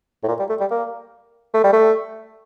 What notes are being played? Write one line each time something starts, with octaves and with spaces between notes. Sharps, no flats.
A2
A#2
G3
A3
G3
A#3
A3
G3
A3